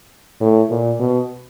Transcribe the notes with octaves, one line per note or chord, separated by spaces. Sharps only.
A2
A#2
B2